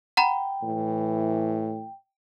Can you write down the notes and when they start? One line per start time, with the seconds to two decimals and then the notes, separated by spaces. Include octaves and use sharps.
0.17 F#5 G5 A#5 B5
0.63 A2 E3